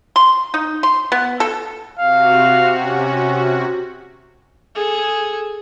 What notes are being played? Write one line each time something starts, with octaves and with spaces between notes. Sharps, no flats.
C6
D#4
C6
B3
A4
C3 F#4 F5
C#4
G#4 A4